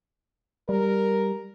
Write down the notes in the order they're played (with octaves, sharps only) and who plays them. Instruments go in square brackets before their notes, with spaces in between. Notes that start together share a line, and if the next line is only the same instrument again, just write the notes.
[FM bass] G3 [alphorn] A#4